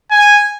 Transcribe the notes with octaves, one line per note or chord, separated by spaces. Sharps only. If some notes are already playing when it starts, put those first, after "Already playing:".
G#5